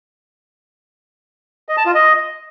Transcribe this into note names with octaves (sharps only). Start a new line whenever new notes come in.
D#5
A5
F4
D#5